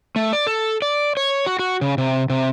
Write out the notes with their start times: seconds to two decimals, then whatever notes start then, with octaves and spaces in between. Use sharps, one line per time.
0.16 A3
0.33 D5
0.47 A4
0.82 D5
1.17 C#5
1.47 F#4
1.59 F#4
1.81 C#3
1.98 C3
2.30 C3